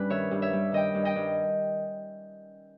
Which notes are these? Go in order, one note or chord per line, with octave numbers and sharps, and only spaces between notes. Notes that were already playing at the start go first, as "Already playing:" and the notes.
Already playing: G2 G3 C#4 G4 B4
D#3 C#5 E5
G2
C#5 E5
G3
D#3 D#5 G5
G2
D#5 G5
G2